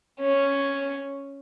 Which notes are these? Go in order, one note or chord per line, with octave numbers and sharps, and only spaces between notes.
C#4